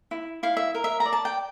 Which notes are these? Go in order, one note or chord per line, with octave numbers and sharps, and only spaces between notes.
E4
E4 F5
E5
A#4
E5
A#5
D5
A5
G5